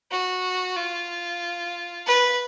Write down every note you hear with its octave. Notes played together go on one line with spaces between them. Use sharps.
F#4
F4
B4